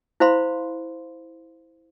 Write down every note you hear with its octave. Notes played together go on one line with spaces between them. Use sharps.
E4 C5 F5 B5 C6